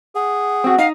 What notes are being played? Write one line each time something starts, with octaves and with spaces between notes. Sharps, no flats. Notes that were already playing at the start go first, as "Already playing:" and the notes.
G#4 F#5
C4 F#4
D#4 F5